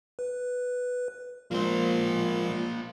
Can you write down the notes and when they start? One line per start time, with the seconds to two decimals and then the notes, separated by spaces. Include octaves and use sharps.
0.19 B4
1.51 A#2 F3 G#3 A#3 C5